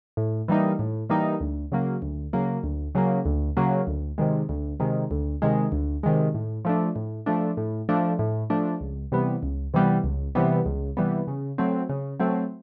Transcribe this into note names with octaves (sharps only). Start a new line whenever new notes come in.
A2
E3 G3 A#3 D#4
A2
E3 G3 A#3 D#4
D2
C#3 F#3 A#3
D2
C#3 F#3 A#3
D2
C#3 F#3 A#3
D2
C#3 F#3 A#3
D2
C3 D#3 G#3
D2
C3 D#3 G#3
D2
C3 D#3 G#3
D2
C3 D#3 G#3
A2
F3 A3 D4
A2
F3 A3 D4
A2
F3 A3 D4
A2
F3 A3 D4
C#2
C3 E3 G3 B3
C#2
C3 E3 G3 B3
C#2
C3 E3 G3 B3
C#2
C3 E3 G3 B3
C#3
F#3 A3 C4
C#3
F#3 A3 C4